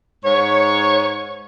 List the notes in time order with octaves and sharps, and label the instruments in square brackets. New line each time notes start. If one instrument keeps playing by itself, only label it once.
[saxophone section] G#2 C#5